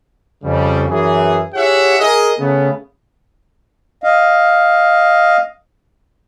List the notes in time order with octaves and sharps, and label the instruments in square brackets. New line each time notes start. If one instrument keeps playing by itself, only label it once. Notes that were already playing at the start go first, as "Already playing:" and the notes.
[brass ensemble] F2 C#3 G3
F#2 E3 G#4
E4 G4 G#4 C#5 E5 F#5
G#4 A#4 D#5
C#3 A3 B3
[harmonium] D#5 F5